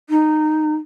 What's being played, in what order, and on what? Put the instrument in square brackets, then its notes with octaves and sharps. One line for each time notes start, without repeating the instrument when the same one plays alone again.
[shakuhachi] D#4